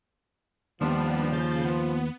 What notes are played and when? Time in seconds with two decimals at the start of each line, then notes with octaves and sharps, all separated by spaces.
0.81 D#2 F3 G3 B3 D4
1.32 C#3 G6 A6
1.65 B3